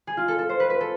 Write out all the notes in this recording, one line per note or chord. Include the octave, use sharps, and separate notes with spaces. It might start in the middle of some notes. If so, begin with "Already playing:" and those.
G#4
F4
A4
A4
C5
B4
B4
A4